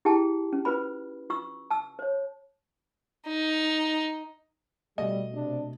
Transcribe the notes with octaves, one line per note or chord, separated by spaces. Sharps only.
E4 G4 G#4 G5 A5
C#4
F4 B4 C5 B5
F4 C#6 E6
A5 E6
C5 C#5
D#4
B2 G3 A3 D#5
C3 D4